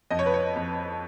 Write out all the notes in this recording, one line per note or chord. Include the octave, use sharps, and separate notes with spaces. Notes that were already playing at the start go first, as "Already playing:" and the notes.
F2 D#5
C#5
B4
C#5
F2